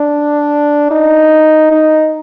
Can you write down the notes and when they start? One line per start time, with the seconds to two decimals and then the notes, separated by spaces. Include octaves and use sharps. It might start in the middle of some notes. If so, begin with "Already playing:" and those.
Already playing: D4
0.91 D#4
1.71 D#4